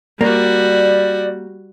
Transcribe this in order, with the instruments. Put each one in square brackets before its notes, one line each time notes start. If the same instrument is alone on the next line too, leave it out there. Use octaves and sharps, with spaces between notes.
[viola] G3 F#4 [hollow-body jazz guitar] A#3 [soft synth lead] D5